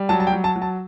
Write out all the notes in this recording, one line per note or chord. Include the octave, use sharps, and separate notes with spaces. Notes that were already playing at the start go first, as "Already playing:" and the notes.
Already playing: G3
F#3 A5
A5
G5
F#3
A5
F#3
A5